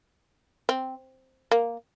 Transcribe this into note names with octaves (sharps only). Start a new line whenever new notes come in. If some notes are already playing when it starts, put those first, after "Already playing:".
C4
A#3